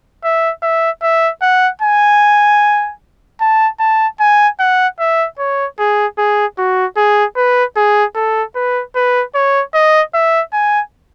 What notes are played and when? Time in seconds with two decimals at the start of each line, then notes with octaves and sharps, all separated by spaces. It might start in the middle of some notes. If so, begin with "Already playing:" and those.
0.24 E5
0.63 E5
1.03 E5
1.42 F#5
1.82 G#5
3.41 A5
3.80 A5
4.20 G#5
4.60 F#5
5.00 E5
5.39 C#5
5.79 G#4
6.18 G#4
6.58 F#4
6.97 G#4
7.37 B4
7.77 G#4
8.16 A4
8.56 B4
8.96 B4
9.35 C#5
9.74 D#5
10.14 E5
10.53 G#5